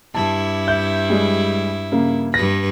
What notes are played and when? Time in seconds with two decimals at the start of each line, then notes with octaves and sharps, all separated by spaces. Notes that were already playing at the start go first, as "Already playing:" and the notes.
0.15 G2 E4 A5
0.67 E5 G6
1.10 G3 G#3
1.92 C#3 A#3
2.34 G2 B4 A#6